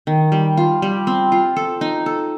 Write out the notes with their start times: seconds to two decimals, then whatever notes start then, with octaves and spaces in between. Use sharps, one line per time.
0.07 D#3
0.32 G3
0.57 F4
0.82 G3
1.07 C4
1.32 F4
1.56 A4
1.81 D#4
2.06 A4